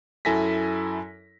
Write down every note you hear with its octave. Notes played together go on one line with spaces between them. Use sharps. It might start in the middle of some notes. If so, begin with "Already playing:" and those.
F#2 E4 A4 G#5 A#6 B6